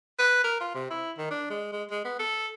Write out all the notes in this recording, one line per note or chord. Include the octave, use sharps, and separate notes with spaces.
B4
A#4
F4
C3
E4
D#3
D4
G#3
G#3
G#3
B3
A4